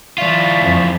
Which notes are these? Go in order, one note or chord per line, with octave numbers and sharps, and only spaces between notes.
E3 F4 D5 E5 C#6
F2